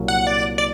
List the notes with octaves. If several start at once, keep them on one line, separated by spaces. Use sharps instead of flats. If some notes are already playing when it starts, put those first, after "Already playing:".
Already playing: C2 A#2 F#3 A#3
F#5
D5
D5